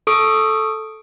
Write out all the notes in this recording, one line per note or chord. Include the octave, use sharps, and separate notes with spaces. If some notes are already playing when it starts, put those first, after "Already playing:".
A4 C#6 D#6 D7